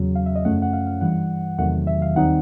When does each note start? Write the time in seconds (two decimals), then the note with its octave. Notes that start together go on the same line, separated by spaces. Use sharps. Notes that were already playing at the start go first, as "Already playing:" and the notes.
Already playing: E2 C#3 F#3
0.15 F5
0.26 E5
0.36 D#5
0.45 F#2 C#3 F3 A3 C#4 F#5
0.62 F#5
0.73 F5
0.87 F5
1.01 G2 E3 G3 F#5
1.58 E2 C3 D#3 F#3 A3 F#5
1.87 E5
2.02 F5
2.16 D#2 D#3 G3 C4 D#4 F#5